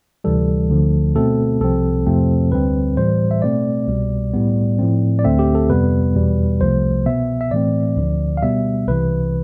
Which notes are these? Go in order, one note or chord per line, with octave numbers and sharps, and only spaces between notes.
D2 C3 E3 G3 A4
D2 D3 F3
B2 A3 C4 A4
C2 C3 F3 C4 A4
F2 C3 F3 A3 C4
D2 D3 G3 C4 B4
A2 E3 G3 C5
E5
B2 A3 C4 D5
C2 B2 G3
A2 G3 B3
A2 F3 A3 C4
D5
D2 D3 A3 C4 E5
G4
A4
F2 C3 G3 B3 B4
E2 B2 G3
C2 C3 F3 A3 C5
B2 B3 E5
E5
A2 E3 A3 C4 D5
D2 D3 F3
F5
B2 G3 B3 E5
C2 C3 E3 B4